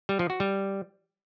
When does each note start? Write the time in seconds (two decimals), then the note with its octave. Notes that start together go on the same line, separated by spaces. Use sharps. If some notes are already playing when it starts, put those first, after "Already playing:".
0.09 G3
0.19 F3
0.30 F#4
0.40 G3